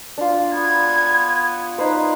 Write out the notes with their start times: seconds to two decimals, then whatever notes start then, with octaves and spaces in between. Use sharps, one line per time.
0.18 D4 F4
0.54 B3 G#6
1.78 D#4 B4 C5